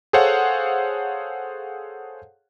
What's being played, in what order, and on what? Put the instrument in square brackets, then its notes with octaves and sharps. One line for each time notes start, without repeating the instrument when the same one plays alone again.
[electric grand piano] G#4 A4 C5 C#5 F5 F#5